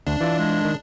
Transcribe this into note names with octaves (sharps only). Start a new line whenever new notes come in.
D2 D4
E3 F4 D5
G#3
D#3